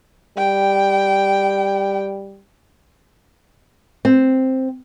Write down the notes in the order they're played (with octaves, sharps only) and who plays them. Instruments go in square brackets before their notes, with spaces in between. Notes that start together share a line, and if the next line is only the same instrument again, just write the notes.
[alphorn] G3 [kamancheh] G5
[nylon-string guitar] C4